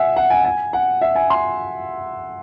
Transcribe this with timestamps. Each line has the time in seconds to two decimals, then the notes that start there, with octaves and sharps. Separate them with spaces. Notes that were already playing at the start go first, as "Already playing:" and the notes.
Already playing: E5 F#5 G#5
0.16 F#5
0.30 G#5
0.45 G#5
0.73 F#5
1.01 E5
1.15 G#5
1.30 C6